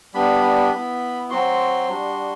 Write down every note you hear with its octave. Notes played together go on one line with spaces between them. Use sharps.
G3 B3 D4 B5
B3 E4
F#3 C4 F#4 C6
G3 D4 F#4